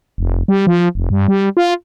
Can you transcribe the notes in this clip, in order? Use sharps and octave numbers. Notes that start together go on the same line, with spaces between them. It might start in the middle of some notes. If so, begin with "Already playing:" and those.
F1
G3
F3
F1
G2
G3
F4